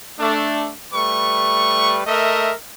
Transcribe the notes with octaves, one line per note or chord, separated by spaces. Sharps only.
A3 D4
G3 A3 B4 C#6
A3 A#4 D#5 E5